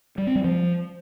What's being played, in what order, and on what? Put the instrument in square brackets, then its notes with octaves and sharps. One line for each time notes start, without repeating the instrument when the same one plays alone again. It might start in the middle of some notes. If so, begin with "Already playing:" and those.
[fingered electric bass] G3
C4
G3
F3